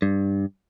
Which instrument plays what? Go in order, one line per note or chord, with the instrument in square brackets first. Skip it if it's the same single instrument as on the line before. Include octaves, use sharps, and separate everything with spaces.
[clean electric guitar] G2